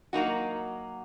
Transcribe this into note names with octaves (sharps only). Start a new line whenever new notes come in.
F#3 A#3 D#4 F#4